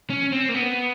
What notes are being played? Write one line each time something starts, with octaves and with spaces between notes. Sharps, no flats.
C#4
C4
A#3
B3